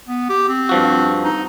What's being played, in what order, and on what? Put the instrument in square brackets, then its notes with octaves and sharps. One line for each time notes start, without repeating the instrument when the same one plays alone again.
[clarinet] B3
G4
C4
[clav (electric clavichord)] G2 F3 F#4
[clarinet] D#4